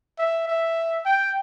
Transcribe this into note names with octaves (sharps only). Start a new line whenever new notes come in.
E5
E5
G5